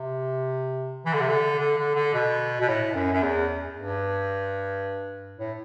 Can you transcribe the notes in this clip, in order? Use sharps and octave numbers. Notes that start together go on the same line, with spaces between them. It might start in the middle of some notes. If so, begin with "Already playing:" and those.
Already playing: C3
E3
D3
C3
D3
D3
D3
D3
B2
B2
A2
F#2
F#2
E2
G2
A2